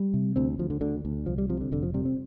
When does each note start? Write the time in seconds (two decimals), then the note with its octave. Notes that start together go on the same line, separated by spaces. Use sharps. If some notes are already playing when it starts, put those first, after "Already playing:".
Already playing: G3
0.14 C3
0.36 D2 C4
0.59 D2 F3
0.70 D3
0.81 D2 D3
1.05 D2
1.26 C2 F3
1.38 G3
1.50 C3 F3
1.61 D3
1.72 F1 D3
1.83 F3
1.94 C3 G3
2.05 C4